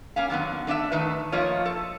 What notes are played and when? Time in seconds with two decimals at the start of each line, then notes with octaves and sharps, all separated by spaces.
0.16 A#3 C#4 G4 F5
0.30 D3 D#3 F#3 B3
0.67 A3 D4 D#5 E5
0.92 D#3 A3 D#4 B4
1.32 F3 A3 A#3 F4 C#5 D#5
1.65 A4